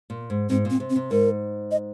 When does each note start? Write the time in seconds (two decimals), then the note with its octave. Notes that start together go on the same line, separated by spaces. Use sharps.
0.10 A#2
0.30 G#2
0.49 G#2 C4
0.65 A#2
0.70 C4
0.80 C3
0.90 C4
0.96 C3
1.11 G#2 A#4
1.71 D#5